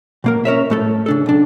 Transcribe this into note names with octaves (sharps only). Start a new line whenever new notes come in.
B2 A#3 A#4
C#4 A#4 C#5 E5
A2 A3 A4
C#3 D4 A4
B1 D4